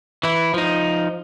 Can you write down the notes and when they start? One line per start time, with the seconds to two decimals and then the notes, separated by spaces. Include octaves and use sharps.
0.23 E3 E4
0.54 F3 D#4